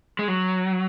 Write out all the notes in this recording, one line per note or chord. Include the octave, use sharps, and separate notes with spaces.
G#3
F#3